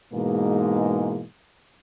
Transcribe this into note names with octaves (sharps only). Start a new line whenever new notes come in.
G#2 B2 E3 G#3 A#3